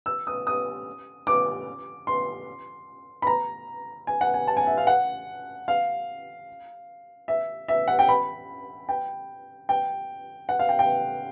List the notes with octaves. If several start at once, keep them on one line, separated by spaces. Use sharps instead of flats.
E6
D#6
D#6
D6
C6
B5
A#5
G#5
F#5
G#5
A5
G#5
E5
F5
F#5
F5
E5
E5
F#5
G5
B5
G5
G5
F#5
F5
G5
G5